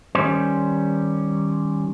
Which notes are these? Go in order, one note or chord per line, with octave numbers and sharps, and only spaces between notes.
D#3 G3 C#4 C5